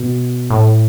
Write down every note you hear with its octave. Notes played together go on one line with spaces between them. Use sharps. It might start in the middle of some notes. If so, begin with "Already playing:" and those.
Already playing: B2
A2